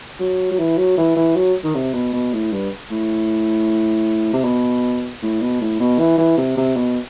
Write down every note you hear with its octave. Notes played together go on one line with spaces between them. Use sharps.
F#3
F#3
E3
F#3
E3
E3
F#3
D#3
C3
B2
B2
A2
G2
A2
C3
B2
A2
B2
A2
B2
E3
E3
C3
C3
B2